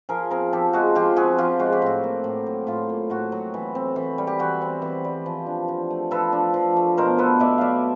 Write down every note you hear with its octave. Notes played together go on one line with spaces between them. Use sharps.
F3 G#4 A#4
C4 G#4 A#4
F3 G4 A4
G#3 F#4 G#4
F3 F4 G4
C4 F#4 G#4
F3 F4 G4
G#3 F#4
G4
A2 F#4
A#3
A2
F#3
A2 F4
A#3
A2 F#4
F#3
E3
C4
E3
G3
G4
E3 F#4
C4
E3
G3
F3
D4
F3
A3
F3 A4 B4
D4
F3
A3
B2 A#4 C5
B3 A4 B4
B2 D5 E5
F#3 D5 E5 F5